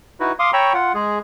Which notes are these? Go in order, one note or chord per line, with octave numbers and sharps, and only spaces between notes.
D#4 E4 F#4 B4
F5 C6 D6 D#6
C#5 G5 A#5 B5 C#6 E6
F4 F#5
G#3 G#4